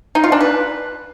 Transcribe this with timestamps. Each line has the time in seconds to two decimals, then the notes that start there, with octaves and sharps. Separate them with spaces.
0.15 D#4
0.24 F4
0.32 D4
0.41 B4